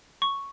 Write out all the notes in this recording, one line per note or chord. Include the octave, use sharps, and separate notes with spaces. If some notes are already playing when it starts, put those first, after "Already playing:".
C#6